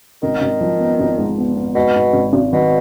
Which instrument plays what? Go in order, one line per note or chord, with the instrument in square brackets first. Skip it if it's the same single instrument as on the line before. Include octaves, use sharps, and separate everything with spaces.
[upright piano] G#1 [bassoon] D#3
[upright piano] G#1
F3
B3
G#1
G#2
B3
B3
[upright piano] G#2 [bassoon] B2
[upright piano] G#2
G#1
G#1
[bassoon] B2 [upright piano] D#3